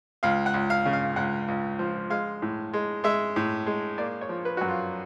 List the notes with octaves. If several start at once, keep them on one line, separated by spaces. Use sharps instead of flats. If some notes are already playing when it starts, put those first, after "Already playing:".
C#2 F5
F#5
C#2
F5
C#3
F5
C#2 F#5
C#2
F3
G#3 F5
A2
G#3
G#3 E5
A2
G#3
A#3 D5
C#5
F3
B4
F#2 F#4
F4